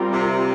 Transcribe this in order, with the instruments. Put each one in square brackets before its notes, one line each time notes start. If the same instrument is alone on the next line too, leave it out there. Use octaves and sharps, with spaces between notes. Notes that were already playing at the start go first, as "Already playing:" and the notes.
Already playing: [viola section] G3 C4 F4 A#4
[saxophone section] C3